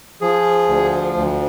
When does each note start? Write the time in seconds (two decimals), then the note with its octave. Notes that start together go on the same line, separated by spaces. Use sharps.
0.21 F3 G#4
0.68 D2
1.16 D2